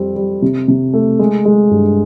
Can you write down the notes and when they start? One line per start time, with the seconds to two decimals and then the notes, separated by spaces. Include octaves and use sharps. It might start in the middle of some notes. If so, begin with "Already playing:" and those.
Already playing: F2 G3 C4
0.16 G3
0.42 C3
0.68 C3
0.93 A3
1.19 G#3
1.45 G#3
1.71 G2